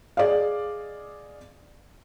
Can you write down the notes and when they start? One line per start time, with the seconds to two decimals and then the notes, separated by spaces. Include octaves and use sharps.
0.17 G#4 D5 D#5 F5